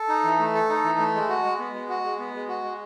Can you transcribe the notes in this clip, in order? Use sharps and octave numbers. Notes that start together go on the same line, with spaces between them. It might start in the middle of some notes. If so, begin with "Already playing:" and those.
Already playing: A4
D#4
E3
A3
A4
D#4
E3
A3
G#3
F#4
G#3
B3
G#3
F#4
G#3
B3
G#3
F#4
G#3